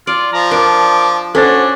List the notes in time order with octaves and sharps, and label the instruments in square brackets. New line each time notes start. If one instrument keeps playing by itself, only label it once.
[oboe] F4 [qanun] D5
[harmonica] F3 [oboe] A#5
[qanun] D4 [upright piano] A#4 [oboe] D6
[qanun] C#4 [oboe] D4 [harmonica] F#4 [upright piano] A4 C5 A6